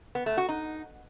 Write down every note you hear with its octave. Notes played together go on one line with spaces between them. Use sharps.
B3
A3
F#4
D#4